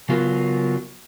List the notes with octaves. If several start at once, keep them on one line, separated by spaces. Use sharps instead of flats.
C#3 F#3 B3 F4 A#4